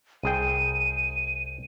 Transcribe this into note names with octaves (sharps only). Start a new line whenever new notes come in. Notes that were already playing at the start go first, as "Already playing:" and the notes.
C2 G#4 G5 D#7